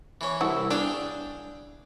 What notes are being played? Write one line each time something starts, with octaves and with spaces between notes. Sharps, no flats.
E3 C#4
C2 E4 F#4
D4 G#4 F5 G5